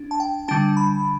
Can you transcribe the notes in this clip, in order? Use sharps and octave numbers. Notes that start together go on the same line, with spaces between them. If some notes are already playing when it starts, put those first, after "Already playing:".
Already playing: D4
A5
G5
D3 G3 D4 A5
B5